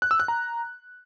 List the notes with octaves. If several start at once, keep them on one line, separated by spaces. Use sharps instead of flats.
F#6
E6
F#6
A#5